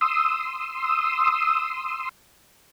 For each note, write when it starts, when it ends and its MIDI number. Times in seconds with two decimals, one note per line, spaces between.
0.01 2.09 84
0.01 2.09 87
0.01 2.09 88